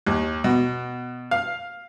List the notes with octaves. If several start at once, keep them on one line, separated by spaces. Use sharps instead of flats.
D#2
B2
F5